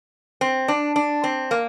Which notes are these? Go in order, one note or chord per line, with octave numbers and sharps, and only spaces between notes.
C4
D4
D4
C4
A#3